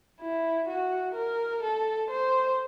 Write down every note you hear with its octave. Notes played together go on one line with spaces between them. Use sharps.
E4
F#4
A#4
A4
C5